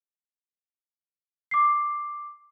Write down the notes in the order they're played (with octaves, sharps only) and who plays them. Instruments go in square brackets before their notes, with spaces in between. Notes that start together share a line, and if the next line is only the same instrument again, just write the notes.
[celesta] D6 C7